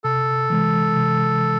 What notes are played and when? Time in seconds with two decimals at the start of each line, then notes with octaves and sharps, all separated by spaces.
0.04 C3 A4
0.50 E3 G#3
0.96 C3